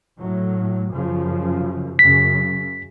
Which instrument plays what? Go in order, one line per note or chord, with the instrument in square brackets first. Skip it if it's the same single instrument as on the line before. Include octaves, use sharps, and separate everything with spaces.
[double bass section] A2 F#3
F#2 C#3 F3
[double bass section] F#2 C#3 [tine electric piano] B6